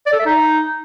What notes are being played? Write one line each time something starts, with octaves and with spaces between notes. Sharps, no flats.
D5
A4
E5
D#4